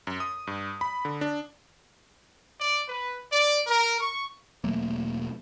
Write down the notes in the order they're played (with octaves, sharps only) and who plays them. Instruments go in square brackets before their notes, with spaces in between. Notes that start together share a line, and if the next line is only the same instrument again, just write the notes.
[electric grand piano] F#2
D#6
G2
B5
D3
D4
[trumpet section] D5
B4
D5
A#4
C#6
[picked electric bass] E1 F#3 A3 A#3